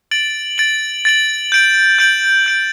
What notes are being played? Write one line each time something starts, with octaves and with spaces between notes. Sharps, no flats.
A6 D7 F#7
A6 D7 F#7
A6 D7 F#7
G6 D7 F#7
G6 D7 F#7
G6 D7 F#7